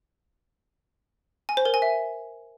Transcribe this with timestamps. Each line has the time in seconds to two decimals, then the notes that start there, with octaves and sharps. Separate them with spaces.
1.49 G#5
1.57 C5
1.65 A#4
1.74 G#5
1.82 E5